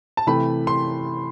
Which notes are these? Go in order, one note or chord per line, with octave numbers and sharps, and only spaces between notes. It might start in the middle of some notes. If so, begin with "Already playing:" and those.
A5
C3 E3 A3 B5
C6